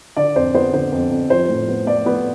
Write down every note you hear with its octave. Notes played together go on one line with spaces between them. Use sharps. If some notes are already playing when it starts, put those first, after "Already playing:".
D3 D5
F2 C5
B3 C5
D3 C5
F2
F2
F3 C5
A2
B3
B3 D5
B3